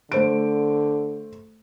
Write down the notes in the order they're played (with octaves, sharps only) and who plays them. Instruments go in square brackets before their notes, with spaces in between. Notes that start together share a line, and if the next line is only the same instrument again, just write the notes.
[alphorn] D3 [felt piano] A3 C5 D7